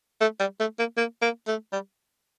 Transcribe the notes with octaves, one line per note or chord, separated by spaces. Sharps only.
A3
G3
A3
A#3
A#3
A#3
A3
G3